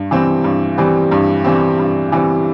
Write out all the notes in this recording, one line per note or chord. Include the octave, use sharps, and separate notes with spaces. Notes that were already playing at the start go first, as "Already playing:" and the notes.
Already playing: G2
E3 G3 C4
G2
E3 G3 C4
G2
E3 G3 C4
G2
E3 G3 C4